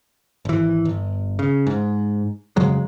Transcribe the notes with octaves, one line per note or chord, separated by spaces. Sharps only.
G#1 E3
G1
C#3
G#2
F2 C#3 F#3 G#3